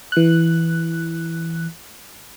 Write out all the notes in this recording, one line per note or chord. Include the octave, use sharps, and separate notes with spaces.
E3 F#6